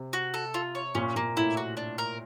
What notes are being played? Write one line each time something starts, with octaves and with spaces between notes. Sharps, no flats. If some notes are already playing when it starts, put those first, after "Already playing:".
Already playing: C3
F#4
A4
F4
C#5
A#2 C#4
A#2 A#3
A2 E4
F#4
D4
A#4